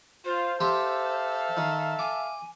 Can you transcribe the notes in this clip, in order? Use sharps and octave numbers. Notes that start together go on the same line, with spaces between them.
F4 C5
G4 A4 E5 F5 G5 C6
D#3
G#5 D6